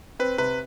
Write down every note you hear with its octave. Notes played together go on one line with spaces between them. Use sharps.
C4 B4
C3 B4